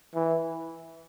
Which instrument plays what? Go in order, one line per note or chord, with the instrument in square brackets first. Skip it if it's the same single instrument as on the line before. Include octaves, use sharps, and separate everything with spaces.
[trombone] E3